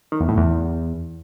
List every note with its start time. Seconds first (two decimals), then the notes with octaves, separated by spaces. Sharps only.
0.12 D#3
0.20 E2
0.29 A2
0.37 E2